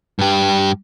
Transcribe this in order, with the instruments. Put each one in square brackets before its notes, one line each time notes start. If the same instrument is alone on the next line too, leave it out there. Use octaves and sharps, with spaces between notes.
[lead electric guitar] G2 G4